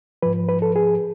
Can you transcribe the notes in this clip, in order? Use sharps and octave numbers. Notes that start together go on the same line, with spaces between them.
G#2 F3 B4
B4
A4
G#4